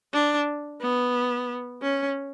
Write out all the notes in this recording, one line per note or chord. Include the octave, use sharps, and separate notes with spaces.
D4
B3
C#4